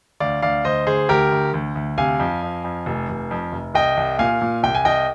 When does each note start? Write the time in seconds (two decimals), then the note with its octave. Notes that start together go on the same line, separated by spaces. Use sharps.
0.20 D2 D5 F5
0.42 D2 D5 F5
0.65 D2 C5 D#5
0.87 D2 G#4 C5
1.09 D2 G4 A#4
1.32 D2
1.54 D2
1.76 D2
1.98 C3 F5 G#5
2.20 F2
2.43 F2
2.64 F2
2.86 F1
3.09 F1
3.31 F2
3.52 F1
3.75 C2 D#5 G5
3.97 C2
4.19 A#2 F5 G#5
4.41 A#2
4.63 C2 G5
4.75 G#5
4.85 C2 D#5 G5